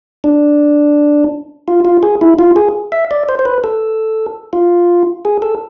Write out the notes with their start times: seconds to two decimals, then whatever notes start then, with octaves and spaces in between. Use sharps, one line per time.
0.24 D4
1.68 F4
1.85 F4
2.03 G#4
2.21 E4
2.39 F4
2.56 G#4
2.92 E5
3.11 D5
3.29 C5
3.39 C5
3.45 B4
3.64 A4
4.53 F4
5.25 G#4
5.42 A4